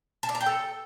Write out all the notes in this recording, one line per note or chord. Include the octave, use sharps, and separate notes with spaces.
A5
D5
A#5
G5
A4